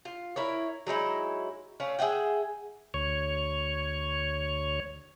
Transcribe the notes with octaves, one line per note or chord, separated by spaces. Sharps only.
F4
E4 A#4 C#5
F#3 G#3 D#4 E4
A3 C#4 F5
G#4 E5 F#5 G5
D2 C#5